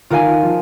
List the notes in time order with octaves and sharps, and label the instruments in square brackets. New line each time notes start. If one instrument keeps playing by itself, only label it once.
[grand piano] D#3 [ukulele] F4 A#4 F5 G#5
[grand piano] F3